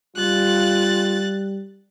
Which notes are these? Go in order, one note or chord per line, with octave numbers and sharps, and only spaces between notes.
G3 F4 F#6 A6